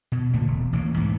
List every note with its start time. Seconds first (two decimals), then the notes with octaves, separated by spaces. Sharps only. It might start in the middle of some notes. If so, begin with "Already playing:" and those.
0.12 B2
0.33 A#2 D3 A3
0.48 E1
0.73 A1 E3 G#3 A#3
0.97 G#2 E3 F3 A3